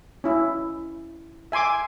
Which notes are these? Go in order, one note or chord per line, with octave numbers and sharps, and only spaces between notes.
C#4 E4
E5 G#5 C6 D6